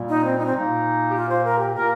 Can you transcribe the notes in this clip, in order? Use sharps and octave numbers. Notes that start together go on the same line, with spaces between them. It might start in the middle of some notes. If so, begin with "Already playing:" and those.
Already playing: A#2 G3 A#3
D#4
C4
D#4
C4
A#2 A#3 D#4
G4
F4
C5
A#4
G4
A#2 A#3 A#4